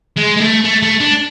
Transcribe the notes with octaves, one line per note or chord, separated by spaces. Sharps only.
G#3
G#3
A3
A3
A3
D4